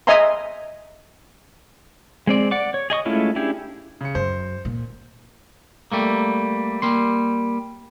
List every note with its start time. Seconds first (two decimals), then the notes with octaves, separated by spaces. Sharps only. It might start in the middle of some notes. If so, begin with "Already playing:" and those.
0.07 D#5 E5 G#5 A#5 C6
2.27 G#3 C4 D5
2.51 D5 F#5 D6
2.74 C#5
2.90 G#4 D#5 C#6 D#6
3.05 G#3 A3 C#4 E4 F4
3.36 C#4 D4 E4 G4 G#4
4.01 C#3 C#7
4.15 F#2 C5
4.65 A#2
5.92 G3 A3 A#3
6.82 G3 A#3 C6